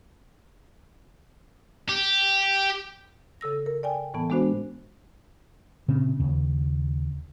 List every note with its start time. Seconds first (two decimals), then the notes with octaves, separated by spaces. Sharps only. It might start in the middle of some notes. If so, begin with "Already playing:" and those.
1.89 G4
3.41 C#3 A4 E6 A#6
3.66 A#4
3.83 D5 G5 G#5
4.14 A2 E3 B3 A5
4.30 G#3 B3 D4 F#4 C5
5.88 A#2 C#3 C4
6.19 D#2 C#3